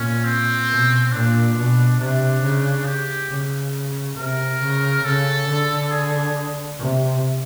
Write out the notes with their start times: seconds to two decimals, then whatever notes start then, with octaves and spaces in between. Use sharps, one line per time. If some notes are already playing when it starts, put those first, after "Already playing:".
Already playing: A#2 C#4
0.24 C4
0.69 B2
1.12 A#2 D4
1.56 B2
1.99 C3 D4
2.43 C#3
2.86 G4
3.30 C#3
4.17 C3 A#4
4.61 C#3
5.05 C#3 A4
5.48 D3
5.91 G#4
6.79 C3